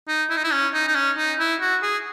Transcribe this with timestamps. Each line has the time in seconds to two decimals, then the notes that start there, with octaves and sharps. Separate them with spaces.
0.08 D#4
0.30 E4
0.37 D#4
0.44 E4
0.52 C#4
0.74 D#4
0.88 D#4
0.95 C#4
1.17 D#4
1.40 E4
1.61 F#4
1.82 G#4